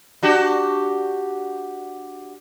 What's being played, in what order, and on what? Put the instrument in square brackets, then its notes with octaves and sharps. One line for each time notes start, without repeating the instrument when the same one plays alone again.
[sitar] D4 F#4 G4